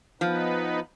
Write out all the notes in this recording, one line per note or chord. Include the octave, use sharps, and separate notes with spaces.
F3 B3 D#4 B4